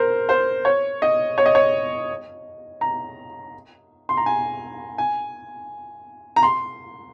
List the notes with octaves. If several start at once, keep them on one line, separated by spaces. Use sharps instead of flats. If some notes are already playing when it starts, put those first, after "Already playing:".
Already playing: A#4 C5
C5
C#5
D#5
C#5
D#5
C#5
A#5
C6
A#5
G#5
G#5
A#5
C6